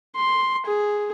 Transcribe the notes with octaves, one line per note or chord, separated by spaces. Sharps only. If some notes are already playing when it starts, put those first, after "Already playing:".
C6
G#4